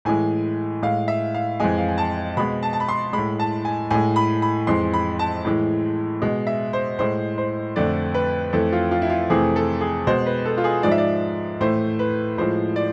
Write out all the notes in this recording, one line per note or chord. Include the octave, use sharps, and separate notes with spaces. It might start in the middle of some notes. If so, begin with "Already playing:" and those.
A2 E3 G#3 G#5
A2 G#3 F5
E5
F5
F2 E3 G#3 G#5
F5
G#5
A5
B2 G#3 B5
A5
A5
B5
C6
A2 G#3 B5
A5
G#5
A2 G#3 G#5
B5
B5
F2 E3 G#3 C6
B5
A5
A2 E3 G#3
B2 G#3
E5
C5
A2 G#3 C5
C5
F2 D3 A3 D5
B4
F2 E3 A3 A4
F4
F4
E4
F4
F2 C3 E3 A3 G#4
A4
G#4
B2 G#3 C5
B4
A4
F4
G#4
G#2 F3 G#3 D5
E5
D5
A2 E3 A3 C5
B4
A2 F3 G#3 C5
D5